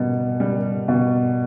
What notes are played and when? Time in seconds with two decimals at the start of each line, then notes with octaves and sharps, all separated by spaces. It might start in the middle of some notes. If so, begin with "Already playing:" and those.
Already playing: B2 G3
0.40 G3
0.88 B2